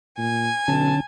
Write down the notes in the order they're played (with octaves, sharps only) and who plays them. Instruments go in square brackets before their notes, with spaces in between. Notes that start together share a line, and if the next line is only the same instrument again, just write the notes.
[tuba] A#2 [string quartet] G#5
[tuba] B1 [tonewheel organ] D3 C#4 [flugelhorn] A5